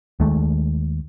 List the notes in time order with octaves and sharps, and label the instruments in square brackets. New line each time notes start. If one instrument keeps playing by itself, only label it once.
[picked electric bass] D#2 D#3 G#3 A3